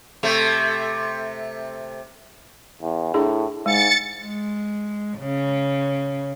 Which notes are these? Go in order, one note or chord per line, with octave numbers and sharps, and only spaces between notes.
C3 A3
E2
A2 D4 E4 G#4
G#2 G#3 A6 C#7
G#3
C#3